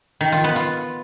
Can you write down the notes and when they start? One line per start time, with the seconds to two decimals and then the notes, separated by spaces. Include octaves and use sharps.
0.21 D#3
0.32 F4
0.44 B3
0.56 F4